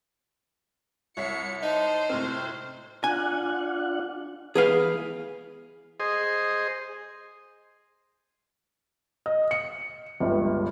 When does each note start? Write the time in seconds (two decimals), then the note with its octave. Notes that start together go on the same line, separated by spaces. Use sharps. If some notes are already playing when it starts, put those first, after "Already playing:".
1.17 C2 C#5 E5 B6 C#7
1.63 D#4 C5 A5
2.09 A2 C3 C4 F6
3.04 D4 F4 F#5 G#5
4.55 E3 B3 G#4 B4 F5
6.00 G#4 C5 D#5
9.26 D#5
9.51 C#7
10.20 G1 C#2 G2